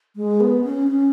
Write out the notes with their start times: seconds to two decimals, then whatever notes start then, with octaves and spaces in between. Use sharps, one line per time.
0.16 G#3
0.40 B3
0.64 C#4
0.88 C#4